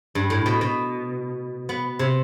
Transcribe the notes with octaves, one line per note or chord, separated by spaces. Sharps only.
G2
A2
B2
B2
B3
C3